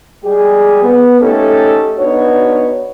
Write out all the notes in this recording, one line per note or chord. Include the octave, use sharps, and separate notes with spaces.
G3 G#3 G4 G#4
B3
A3 C#4 D#4 G4 A4
B3 D4 D#4 F#4 B4 C#5